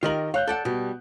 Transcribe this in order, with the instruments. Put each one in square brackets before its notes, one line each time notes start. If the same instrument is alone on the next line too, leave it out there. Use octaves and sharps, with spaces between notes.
[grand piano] D#3 D#5 F#7 [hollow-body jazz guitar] F4 G4 A#4
[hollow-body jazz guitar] C#5 [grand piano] F5 F#6 G6
[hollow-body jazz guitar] A4 D5 F#5 [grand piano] G6
[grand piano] B2 [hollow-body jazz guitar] G3